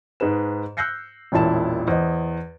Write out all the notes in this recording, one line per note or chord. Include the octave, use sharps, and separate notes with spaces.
G#2 G#4 B4 E7
E6 F#6 G6 A#6 C7 C#7
E1 A1 A#2 E4 A5 E7
E2 C5 D#5